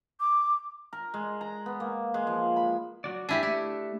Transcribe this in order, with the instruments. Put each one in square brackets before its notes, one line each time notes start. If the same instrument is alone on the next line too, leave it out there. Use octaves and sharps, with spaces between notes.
[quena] D6
[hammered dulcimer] A#4
G#3
A#5
B3
A#3
G#3
F3
B5
[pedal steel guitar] F#3 F#4 D5
[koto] D4 E4 G4 [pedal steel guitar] G#5
[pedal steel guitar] A3 D4 [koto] E4